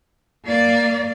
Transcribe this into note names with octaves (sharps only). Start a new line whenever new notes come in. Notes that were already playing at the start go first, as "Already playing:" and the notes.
A#3 D5